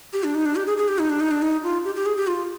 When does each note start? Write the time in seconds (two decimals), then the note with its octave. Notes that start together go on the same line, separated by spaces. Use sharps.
0.13 G4
0.24 D4
0.35 D#4
0.45 D4
0.56 G4
0.67 G#4
0.77 G#4
0.88 G4
0.99 D#4
1.09 D4
1.20 D#4
1.31 D4
1.42 D#4
1.63 F4
1.85 G4
1.95 G4
2.06 G#4
2.17 G4
2.27 F4